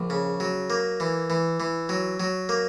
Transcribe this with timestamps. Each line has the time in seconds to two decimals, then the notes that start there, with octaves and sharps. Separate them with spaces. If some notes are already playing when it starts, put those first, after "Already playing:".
Already playing: A#1
0.10 C#3
0.40 F#3
0.70 A#3
1.00 E3
1.30 E3
1.60 E3
1.89 F#3
2.20 F#3
2.49 A#3